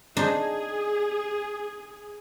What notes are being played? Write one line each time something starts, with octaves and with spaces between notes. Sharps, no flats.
D4 D#4 G#4 C5